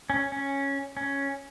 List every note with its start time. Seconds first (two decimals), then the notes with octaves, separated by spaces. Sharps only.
0.10 C#4
0.32 C#4
0.97 C#4